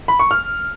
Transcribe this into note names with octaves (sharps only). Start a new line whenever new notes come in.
B5
C#6
F6